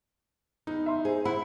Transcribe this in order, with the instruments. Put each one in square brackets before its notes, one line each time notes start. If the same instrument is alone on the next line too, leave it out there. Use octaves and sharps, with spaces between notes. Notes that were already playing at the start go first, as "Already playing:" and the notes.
[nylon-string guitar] E2 [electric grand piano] D#4
[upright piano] E5 C6
[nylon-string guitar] G#4 [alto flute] C5
[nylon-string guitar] E4 F#5 [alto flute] C5 [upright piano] B5